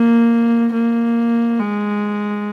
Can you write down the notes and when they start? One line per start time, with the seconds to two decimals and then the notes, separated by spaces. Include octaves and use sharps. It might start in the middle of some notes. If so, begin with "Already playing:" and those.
Already playing: A#3
0.73 A#3
1.60 G#3